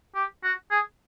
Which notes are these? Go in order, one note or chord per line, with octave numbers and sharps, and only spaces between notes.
G4
F#4
G#4